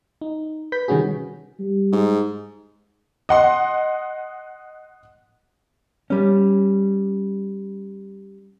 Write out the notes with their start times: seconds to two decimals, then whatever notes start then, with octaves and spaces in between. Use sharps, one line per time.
0.21 D#4
0.72 B4 G6 B6
0.88 C3 D#3 G3 C#4 F#4 G#4
1.59 G3
1.92 G#2
3.29 D#5 F#5 C6
6.10 G3 C#4